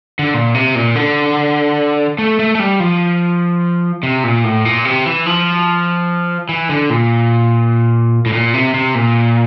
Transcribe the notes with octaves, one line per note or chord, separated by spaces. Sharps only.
D3
A#2
C3
A#2
D3
A3
A3
A3
G3
F3
C3
A#2
A2
A#2
C3
E3
F3
E3
D3
A#2
A2
A#2
C3
C3
A#2